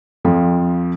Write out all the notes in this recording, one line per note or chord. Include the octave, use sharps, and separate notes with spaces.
F2 F3